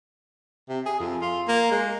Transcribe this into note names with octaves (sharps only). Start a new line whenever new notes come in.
C3
G#4
F2
F4
A#3
G#3